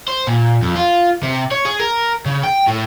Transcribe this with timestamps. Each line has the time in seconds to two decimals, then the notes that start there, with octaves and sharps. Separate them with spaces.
0.08 C5
0.27 A#2
0.62 F2
0.76 F4
1.23 C3
1.51 C#5
1.65 G#4
1.79 A#4
2.26 C#3
2.44 G5
2.68 A2